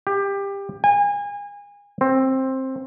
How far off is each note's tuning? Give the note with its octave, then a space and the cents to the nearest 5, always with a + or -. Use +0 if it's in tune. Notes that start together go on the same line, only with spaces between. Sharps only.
G4 +20
G#5 -30
C4 +15